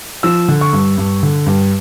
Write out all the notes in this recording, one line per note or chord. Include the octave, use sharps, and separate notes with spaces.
F3 E6
D3
C#6
G2
G2
D3
G2